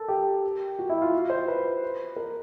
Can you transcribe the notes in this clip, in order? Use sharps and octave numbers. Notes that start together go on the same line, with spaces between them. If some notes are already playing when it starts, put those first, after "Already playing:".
Already playing: A4 A#4
G4
F#4
E4
F4
F#4
C5
B4
A#4